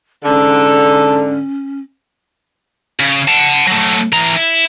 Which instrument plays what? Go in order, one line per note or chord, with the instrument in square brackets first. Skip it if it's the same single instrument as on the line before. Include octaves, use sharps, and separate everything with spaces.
[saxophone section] G#2 D3 [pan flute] C#4 [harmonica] A4
[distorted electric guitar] C#3
F#5 A5
F#3 A3
E3 A#5
E4